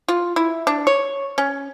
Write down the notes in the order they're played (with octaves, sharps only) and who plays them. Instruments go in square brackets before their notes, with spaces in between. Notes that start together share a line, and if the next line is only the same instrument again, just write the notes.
[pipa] F4
E4
D4
C#5
C#4